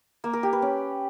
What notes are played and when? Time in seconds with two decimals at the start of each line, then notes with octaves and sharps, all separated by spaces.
0.24 A#3
0.33 A#4
0.43 G4
0.53 B4
0.62 C#4